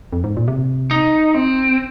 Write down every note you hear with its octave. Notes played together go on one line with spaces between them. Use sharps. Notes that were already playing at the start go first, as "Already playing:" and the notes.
F2
G#2
A#2
C3
D#4
C4